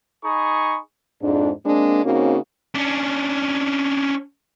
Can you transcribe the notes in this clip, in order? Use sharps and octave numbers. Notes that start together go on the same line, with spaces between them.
D#4 G#4 B5 C#6
F2 G#2 D4
G#3 A#3 C4 D4
C#3 A#3 C4 C#4 D#4 F#4
C#4 D4